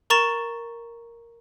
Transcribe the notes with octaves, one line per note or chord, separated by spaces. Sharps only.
A#4 A#5 C#6 A6 E7